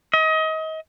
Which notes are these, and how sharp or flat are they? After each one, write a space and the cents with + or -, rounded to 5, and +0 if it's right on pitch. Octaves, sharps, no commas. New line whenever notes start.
D#5 +30